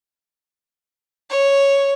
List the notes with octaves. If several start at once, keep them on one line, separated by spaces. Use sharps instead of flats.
C#5